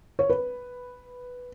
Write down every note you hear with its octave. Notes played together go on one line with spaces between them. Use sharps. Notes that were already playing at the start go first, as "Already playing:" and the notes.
C#5
B4